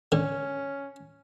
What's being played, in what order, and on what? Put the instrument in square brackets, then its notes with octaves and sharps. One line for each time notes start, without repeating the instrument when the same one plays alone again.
[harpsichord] D3 [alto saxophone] C#4